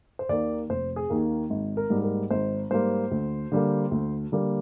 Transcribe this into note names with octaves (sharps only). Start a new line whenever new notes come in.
C5
D#2 D#3 A#3 D5
F1 C5
G#4
D#2 D#3 A#3
G#1
A#4
G#2 G3 A#3
A#4
G#1 C5
G#2 G3 A#3 C5
D2
D3 G3 A#3
D2
D3 G3 A#3